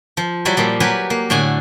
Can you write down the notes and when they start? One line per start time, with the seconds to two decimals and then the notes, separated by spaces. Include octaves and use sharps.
0.17 F3
0.45 F#3 G3 E4 F#4
0.57 A#2 F3 G3
0.80 F#3 G4 A#4 B4 G#5
1.10 A#3
1.30 A2 D3 F#4 G#5